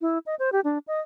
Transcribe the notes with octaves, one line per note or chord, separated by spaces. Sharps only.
E4
D#5
C5
G4
D4
D#5